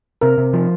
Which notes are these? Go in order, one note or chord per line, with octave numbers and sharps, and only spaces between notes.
C3 A#4
C3
F3